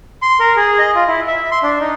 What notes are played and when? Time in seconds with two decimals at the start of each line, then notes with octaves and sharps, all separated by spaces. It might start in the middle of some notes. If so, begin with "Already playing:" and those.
0.22 C6
0.40 A#4
0.56 G#4
0.79 D#5
0.95 F4
1.07 E4
1.28 E5
1.51 C6
1.63 D4
1.80 D#4